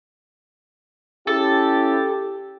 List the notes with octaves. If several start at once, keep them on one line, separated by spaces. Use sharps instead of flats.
C#4 E4 G4 A4